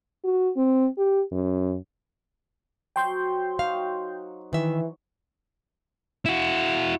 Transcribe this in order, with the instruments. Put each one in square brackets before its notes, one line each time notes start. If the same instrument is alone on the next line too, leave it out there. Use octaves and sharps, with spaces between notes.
[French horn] F#4
C4
G4
F#2
[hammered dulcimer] F#3 C5 [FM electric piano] G5 C6 G6
[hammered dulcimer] D#4 F#4 [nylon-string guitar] F5
[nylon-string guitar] D#3 E5 [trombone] E3
[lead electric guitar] E4 F#4